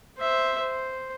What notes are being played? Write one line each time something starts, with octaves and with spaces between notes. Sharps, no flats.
C5 E5
C5